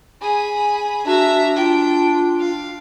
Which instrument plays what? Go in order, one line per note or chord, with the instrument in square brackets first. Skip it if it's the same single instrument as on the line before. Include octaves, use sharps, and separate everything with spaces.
[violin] G#4 B5 [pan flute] G#5
[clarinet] D4 [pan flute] F#4 [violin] E5 A#5
[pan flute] F4 [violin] G5
[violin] F5